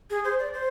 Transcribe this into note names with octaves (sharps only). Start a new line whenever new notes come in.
G#4
C5
D5
C5